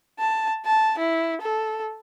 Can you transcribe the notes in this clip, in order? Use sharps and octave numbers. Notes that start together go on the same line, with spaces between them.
A5
A5
E4
A4